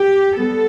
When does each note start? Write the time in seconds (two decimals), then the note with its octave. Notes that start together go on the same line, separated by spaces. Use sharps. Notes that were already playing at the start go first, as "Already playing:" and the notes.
Already playing: G4
0.37 G3 B3 A4